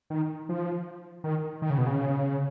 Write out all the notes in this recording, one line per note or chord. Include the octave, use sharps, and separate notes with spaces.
D#3
F3
D#3
D#3
C#3
B2
C#3